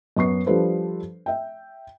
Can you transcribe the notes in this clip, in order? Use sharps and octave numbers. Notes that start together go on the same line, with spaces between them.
F#2 B3 C#6 C7
F3 G3 D4 A4 B4 C5
E5 G5